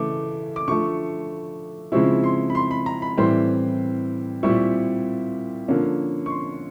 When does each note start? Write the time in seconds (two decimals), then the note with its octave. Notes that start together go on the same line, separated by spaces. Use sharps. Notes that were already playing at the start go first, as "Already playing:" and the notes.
Already playing: C#3 E3 A3 D6
0.56 D6
0.68 D3 F3 A3 C#6
1.92 C#3 F3 G#3 C4 E4 C#6
2.24 C6
2.50 B5
2.55 C6
2.71 B5
2.86 A#5
3.02 B5
3.18 A2 E3 G3 C4 C6
4.43 A#2 G3 C4 E4 C#6
5.68 D3 F3 A#3 C#4
6.26 C#6
6.30 C6